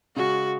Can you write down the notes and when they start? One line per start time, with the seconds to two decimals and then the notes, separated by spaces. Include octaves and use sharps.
0.16 C#3 G#3 C#4 F#4